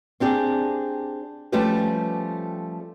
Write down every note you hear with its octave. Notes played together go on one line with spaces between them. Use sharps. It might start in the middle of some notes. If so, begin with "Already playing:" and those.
C4 D4 G4 G#4
F3 G3 A3 C#4 G4 B4